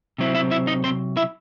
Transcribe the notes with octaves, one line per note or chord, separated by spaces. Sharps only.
C3 F#3 C4 E4
E4 E5
E4 E5
D#4 D#5
C4 C5
E4 E5